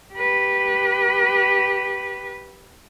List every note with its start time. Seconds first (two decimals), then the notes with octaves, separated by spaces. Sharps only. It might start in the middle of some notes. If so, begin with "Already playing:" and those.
0.14 G4 B4